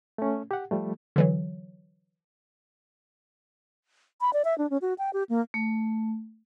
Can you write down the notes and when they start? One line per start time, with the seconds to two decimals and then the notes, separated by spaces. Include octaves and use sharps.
0.18 A3 C#4
0.51 G4 F#5
0.71 F3 G3 A3
1.16 D3 E3 F#3
4.21 B5
4.33 D5
4.45 E5
4.58 D4
4.70 C#4
4.82 F#4
4.98 G5
5.13 G4
5.29 A#3
5.54 A3